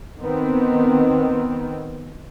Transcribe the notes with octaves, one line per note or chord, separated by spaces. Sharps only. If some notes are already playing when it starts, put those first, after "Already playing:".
D#3 B3 C4